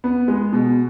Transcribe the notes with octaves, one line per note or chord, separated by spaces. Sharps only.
B3
G#3
B2